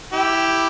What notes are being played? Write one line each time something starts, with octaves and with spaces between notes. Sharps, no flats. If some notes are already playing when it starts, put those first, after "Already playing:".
E4 G4